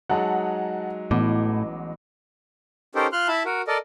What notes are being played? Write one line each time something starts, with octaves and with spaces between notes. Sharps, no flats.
F#3 G#3 D#4 F#5 A5
A1 A2 B3 D6
C#4 D#4 G4 A4 A#4 C5
F4 C6 F6 F#6
E4 E5 A5 B5
F#4 A#4
A4 A#4 D5 D#5